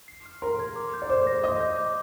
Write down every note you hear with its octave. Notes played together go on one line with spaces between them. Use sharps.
C7
F6
A#4 C6
G#6
D6
G6
D5
C5 D6
A#6
D#5 D6
G6
D6